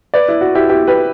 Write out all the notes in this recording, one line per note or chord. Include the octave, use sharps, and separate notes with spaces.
B4 D5
E4
F#4
E4 G4
E4 G4
G4 B4